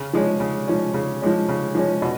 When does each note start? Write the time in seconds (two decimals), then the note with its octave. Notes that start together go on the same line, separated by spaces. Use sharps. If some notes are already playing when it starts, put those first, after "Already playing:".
Already playing: C#3
0.13 F3 G#3 C#4
0.40 C#3
0.68 F3 G#3 C#4
0.94 C#3
1.22 F3 G#3 C#4
1.49 C#3
1.75 F3 G#3 C#4
2.02 B2